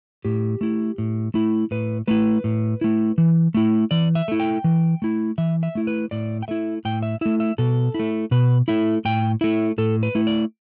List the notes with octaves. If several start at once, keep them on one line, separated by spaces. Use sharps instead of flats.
A2 G4
A3 E4
A2
A3 E4
A2 B4
A3 E4 B4
A2
A3 E4
E3
A3 E4
E3 D5
E5
A3 E4
G5
E3
A3 E4
E3 E5
E5
A3 E4
B4
A2 D5
G5
A3 E4 E5
A2 G5
E5
A3 E4 E5
E5
B2 A4
A3 E4
B2 B4
A3 E4 E5
A2 G5
A3 E4 E5
A2 A4
B4
A3 E4
D5